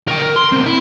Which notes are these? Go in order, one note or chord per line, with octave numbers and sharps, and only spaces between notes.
A#4 G5
A#4
C6
B2 C4
E4